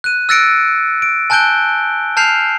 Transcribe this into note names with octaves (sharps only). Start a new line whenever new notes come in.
F#6 D#7
E6 F#6 A6 A#6 C#7 D7
D7
G#5 A5 F#6 G6 D7 G7
A5 F6 G6 C7 F7